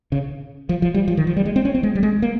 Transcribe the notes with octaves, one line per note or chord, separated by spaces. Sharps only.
C#3
F3
F3
G3
F3
D#3
F3
G3
G#3
C4
C#4
C4
G#3
G3
G#3
A#3